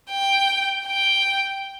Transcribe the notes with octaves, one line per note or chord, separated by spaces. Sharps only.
G5
G5